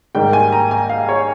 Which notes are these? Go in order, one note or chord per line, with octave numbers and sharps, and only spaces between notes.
G#2 D#3 G3 A#3 G5
G#5
A#5
G#5
F5
C#5